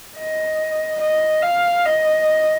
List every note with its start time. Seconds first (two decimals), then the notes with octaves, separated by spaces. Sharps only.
0.18 D#5
1.01 D#5
1.42 F5
1.85 D#5